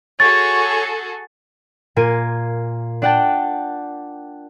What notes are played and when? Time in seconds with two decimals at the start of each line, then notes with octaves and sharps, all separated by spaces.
0.20 F#4 G#4 A4 C#5 C#6 A6
1.96 A#2 A#3 F4 A#4 G#5 D#7
3.02 D4 D5 F#5 G5 A5